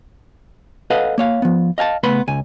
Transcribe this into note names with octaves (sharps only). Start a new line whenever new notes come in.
A4 B4 D#5 F5 F#5
A#3 C#5 F5
F3 B3
D#5 F5 G#5 A5
C#3 A3 B3 B4 B5 C6
C#2 G#5